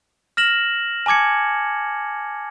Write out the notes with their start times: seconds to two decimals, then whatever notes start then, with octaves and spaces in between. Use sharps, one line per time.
0.37 F6 A#6 E7 F#7
1.06 G#5 A5 D6 G#6 C#7